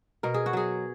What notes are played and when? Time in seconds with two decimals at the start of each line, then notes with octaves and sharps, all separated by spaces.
0.23 B2 A#4
0.34 G#4
0.46 F#4
0.53 F#3 G#4